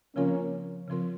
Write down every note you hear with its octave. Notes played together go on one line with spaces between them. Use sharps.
C#3 F3 A#3 C4 C#4 F4 A#4
C#3 F3 C4 F4 A#4